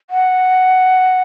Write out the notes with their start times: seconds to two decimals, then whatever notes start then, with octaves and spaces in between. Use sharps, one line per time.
0.10 F#5